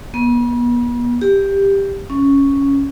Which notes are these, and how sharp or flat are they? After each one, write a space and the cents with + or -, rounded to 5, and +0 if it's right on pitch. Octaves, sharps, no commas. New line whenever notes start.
B3 -40
G4 +10
C#4 +0